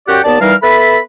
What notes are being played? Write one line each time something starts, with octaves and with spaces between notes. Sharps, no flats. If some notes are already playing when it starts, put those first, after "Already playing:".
F#2 F#4 G4 D5 F#5 G5
D#2 B3 D5 A5
E3 G3 D#4 A#4 F5 F6
B3 A4 E5 B5